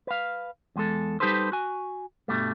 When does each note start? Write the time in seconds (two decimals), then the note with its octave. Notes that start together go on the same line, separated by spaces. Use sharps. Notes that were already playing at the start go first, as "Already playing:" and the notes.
0.07 B4 F5
0.76 E2 G#3 A4
1.20 G3 D#4 G4 A4 B4 C5
1.52 F#4 G#5
2.28 G2 B2 G3 A3